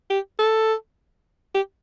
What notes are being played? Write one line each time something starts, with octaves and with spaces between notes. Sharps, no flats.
G4
A4
G4